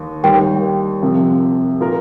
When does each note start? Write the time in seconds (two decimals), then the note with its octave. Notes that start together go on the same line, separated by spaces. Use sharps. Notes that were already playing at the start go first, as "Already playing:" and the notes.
Already playing: D#2 D#3
0.23 D#2 D#3 G3 A#3 G5
1.02 C2 C3 F3
1.80 A#2 A#3 F4 A#4